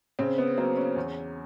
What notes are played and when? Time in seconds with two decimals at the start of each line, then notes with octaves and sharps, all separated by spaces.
0.19 C#3 C4
0.38 B3
0.57 F#3 A#3 C4
0.77 C#4
0.96 E2